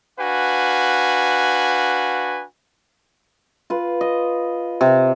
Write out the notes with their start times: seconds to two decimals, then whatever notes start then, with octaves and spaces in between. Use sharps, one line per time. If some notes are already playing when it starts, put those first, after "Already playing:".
0.19 D4 F#4 B4 F5 G#5
3.70 F4 B4
4.01 D#5
4.81 C3